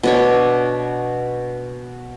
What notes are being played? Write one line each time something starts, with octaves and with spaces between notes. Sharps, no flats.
B2 D4 C#5